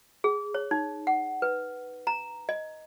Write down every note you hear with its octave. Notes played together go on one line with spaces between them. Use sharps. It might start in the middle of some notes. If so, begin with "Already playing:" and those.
G#4
C#5
D#4
F#5
B4
A#5
D#5